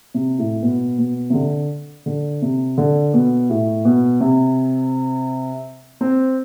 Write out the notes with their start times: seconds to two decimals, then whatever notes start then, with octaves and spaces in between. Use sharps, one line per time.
0.14 C3
0.39 A2
0.62 B2
0.98 B2
1.30 C3
1.34 D3
2.06 D3
2.42 C3
2.77 D3
3.14 B2
3.50 A2
3.85 B2
4.21 C3
6.01 C4